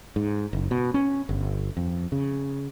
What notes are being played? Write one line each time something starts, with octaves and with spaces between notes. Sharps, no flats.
G#2
F#1
B2
C#4
G1
F2
C#3